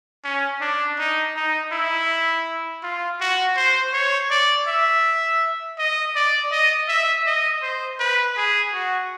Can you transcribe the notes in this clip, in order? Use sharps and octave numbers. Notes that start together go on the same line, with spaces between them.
C#4
D4
D#4
D#4
E4
F4
F#4
C5
C#5
D5
E5
D#5
D5
D#5
E5
D#5
C5
B4
G#4
F#4